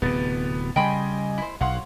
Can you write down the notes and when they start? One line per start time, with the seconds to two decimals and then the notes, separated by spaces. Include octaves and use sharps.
0.02 D1 C3 B3 A6
0.76 C#3 G3 D#5 G5 G#5 B5 C6
1.38 E4 C5
1.61 B1 C#5 F5 F#5 C6